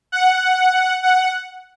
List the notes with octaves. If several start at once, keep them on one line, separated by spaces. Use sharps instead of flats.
F#5
F#5